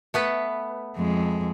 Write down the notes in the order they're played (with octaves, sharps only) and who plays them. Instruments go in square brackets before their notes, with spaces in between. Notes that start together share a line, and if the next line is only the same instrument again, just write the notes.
[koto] A3 B3 B4
[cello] F2 G#3